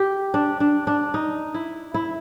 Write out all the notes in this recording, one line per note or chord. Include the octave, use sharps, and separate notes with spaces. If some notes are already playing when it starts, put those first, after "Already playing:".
Already playing: G4
D4
D4
D4
D#4
E4
E4